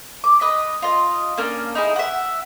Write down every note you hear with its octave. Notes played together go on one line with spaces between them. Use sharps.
D6
B4 D#5
F4 D#5
A#3 C#4 D4
D#4 E4 G#4
E5 F#5